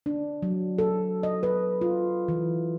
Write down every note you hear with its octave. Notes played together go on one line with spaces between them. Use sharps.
D4
F#3
A4
D#5
B4
F4
E3